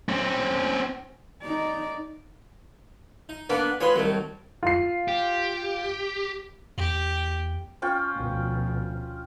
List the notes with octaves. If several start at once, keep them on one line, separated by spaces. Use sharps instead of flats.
C4 C#4
D#4 D5
D#4
A#3 B3 D4 A4 B4
G#3 F4 B4 C#5 C6
C2 A2 D#3 F#3
F4 C7
G4
E2 G4
C#4 F4 G5
D2 B2 F3